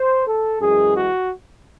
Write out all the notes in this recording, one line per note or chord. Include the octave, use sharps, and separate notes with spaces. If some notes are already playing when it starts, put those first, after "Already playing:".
Already playing: C5
A4
F#2 E3 G#3 G#4
F#4